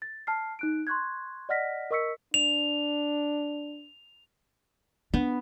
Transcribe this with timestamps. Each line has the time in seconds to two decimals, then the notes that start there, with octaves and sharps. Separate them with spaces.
0.02 A6
0.27 A5 F6 C7
0.59 D#4 F#6 D7
0.87 C6 C#6 F#6 G#6
1.49 D5 D#5 F#5 F6 A#6 B6
1.91 A#4 D#5 C#6 E6 B6 C#7
2.34 D4 F7
5.14 B3 D4